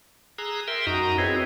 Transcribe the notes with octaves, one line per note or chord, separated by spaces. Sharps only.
G#4 A#5 D#6 E6 F#6
A#4 E5 G5 C6
F#2 D#4 F#4 D#5 A#5
C4 E4 G#4 B4 C#5